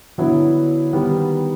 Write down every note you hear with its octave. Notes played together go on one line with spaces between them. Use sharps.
D3 F#3 B3 E4
D#3 G3 B3